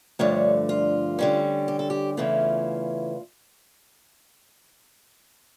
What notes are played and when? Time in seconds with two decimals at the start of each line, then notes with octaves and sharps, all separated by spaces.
0.19 G2 D3 F3 A3 C#5
0.69 F4
1.19 D3 G3 C#4
1.68 G4
1.79 A4
1.90 G4
2.17 E2 C#3 E3 A3 C#4 F4